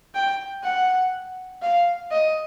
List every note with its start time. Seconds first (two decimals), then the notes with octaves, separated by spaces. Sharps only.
0.15 G5
0.63 F#5
1.62 F5
2.11 D#5